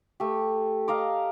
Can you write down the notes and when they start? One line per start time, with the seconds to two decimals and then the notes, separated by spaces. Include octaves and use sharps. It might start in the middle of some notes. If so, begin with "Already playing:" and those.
0.20 A3 G4
0.88 D#5 F5 A#5 D6